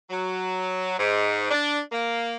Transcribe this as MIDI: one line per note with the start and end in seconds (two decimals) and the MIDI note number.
0.10 0.93 54
0.98 1.49 44
1.50 1.78 62
1.91 2.36 58